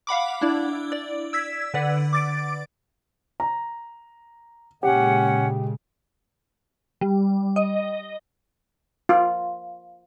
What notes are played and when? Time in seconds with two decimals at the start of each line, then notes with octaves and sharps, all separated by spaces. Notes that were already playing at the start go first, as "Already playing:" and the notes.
0.07 F5 F#5 B5 D6
0.41 D4 E4 D5
0.92 D5
1.33 E6 G#6 B6
1.74 D3 B4 D5 F#5
2.13 D6 A6 D7
3.40 A#5
4.83 A#2 C#3 G#3 C#4 G4 F#5
7.01 G3
7.56 D#5
9.09 F4